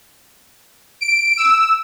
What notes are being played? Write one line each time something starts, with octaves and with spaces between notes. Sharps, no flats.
D7
E6